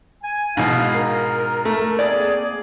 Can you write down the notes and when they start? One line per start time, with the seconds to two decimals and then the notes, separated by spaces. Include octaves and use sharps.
0.23 G#5
0.57 G#2 B2 E4 F5
0.94 A#4
1.65 A3
1.99 A#3 C4 G#4 D5